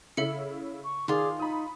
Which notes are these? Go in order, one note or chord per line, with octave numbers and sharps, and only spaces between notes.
C#3 E4 A4 E5 C#7
C#6
D#3 F4 G#4 D5 C6 D6
D#4 B5 D#6